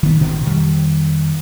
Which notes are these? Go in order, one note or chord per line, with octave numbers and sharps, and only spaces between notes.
D#3 B3
A1 G2 B2 D#3
F2 D#3 G3